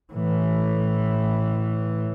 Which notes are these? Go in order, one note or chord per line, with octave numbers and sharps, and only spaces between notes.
A2 E3